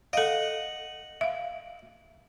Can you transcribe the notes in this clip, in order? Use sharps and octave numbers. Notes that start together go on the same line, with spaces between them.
A4 D#5 F5 F#5
E5 F5